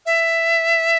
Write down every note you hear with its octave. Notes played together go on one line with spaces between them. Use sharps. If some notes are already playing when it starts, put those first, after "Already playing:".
E5